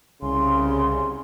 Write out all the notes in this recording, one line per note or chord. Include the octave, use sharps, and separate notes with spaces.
C2 C#3 C6